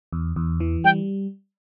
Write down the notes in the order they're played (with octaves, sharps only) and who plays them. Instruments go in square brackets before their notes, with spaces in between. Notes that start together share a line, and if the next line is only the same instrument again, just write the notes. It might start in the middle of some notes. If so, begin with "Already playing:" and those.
[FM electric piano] E2
E2
E3
[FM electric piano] G3 [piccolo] G5